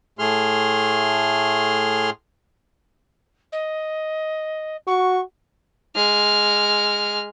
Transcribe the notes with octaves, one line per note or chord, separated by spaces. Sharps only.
A2 A3 G#4 C6 F6
D#5
F#4 C#6
G#3 F6